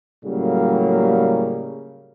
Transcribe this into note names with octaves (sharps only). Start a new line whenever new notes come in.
A2 C#3 F#3 G3 A#3